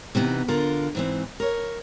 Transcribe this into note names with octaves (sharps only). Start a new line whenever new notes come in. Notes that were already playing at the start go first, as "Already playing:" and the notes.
C3 E3 B3 D#4
D3 F4 A#4
G#2 E3 C4
A#4 C#5